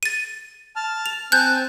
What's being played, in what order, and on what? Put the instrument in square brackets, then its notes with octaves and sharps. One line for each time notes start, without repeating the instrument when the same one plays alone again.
[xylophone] A6 D#7
[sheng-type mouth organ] A5 F6
[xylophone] F7
[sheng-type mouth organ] C4 G#5 A5 [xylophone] F#6 G6